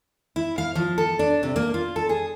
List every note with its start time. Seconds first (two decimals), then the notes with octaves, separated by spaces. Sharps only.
0.36 E4
0.58 F5
0.75 F3
0.98 A4
1.19 D4
1.43 C3
1.56 A#3
1.74 F4
1.96 A4
2.09 G#4